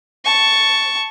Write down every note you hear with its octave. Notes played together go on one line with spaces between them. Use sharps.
A5 C#6